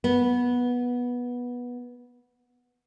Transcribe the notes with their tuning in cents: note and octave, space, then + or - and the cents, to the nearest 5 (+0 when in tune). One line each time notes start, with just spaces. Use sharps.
B3 -15